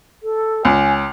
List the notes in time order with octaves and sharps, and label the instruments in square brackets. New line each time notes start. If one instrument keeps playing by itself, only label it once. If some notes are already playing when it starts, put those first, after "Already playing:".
[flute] A4
[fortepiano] C#2 [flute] G#5